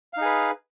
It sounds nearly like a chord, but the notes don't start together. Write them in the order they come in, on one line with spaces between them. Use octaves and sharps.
F5 D#4 G#4 B4